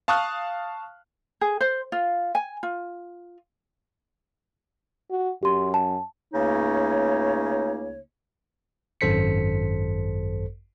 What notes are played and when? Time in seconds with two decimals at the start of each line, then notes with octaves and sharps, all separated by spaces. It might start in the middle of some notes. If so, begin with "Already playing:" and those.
0.08 F5 A5 C#6 D#6 F6 F#6
1.41 G#4
1.61 C5
1.92 F4
2.35 G#5
2.63 F4
5.11 F#4
5.43 F#2 G4 C6
5.74 A5
6.33 C#2 C#3 A3 A#3 D#4 C#5
9.01 G#1 F#2 A4 C5 B6 C#7